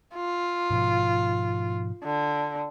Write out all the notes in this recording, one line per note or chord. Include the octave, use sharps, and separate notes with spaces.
F4
G#2 B2 F3
D3